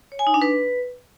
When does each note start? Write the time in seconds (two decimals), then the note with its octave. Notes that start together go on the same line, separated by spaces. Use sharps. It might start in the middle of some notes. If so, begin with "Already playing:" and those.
0.12 C#5
0.19 G#5
0.27 D#4
0.34 D4
0.42 B4